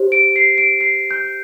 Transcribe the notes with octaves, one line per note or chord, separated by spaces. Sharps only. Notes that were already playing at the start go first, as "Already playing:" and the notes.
Already playing: G4 C5
D7
C7
D7
C7
G6